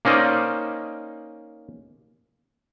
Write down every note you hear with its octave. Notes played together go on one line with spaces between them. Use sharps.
A#3 C#4 D#4 C5 D5 D#5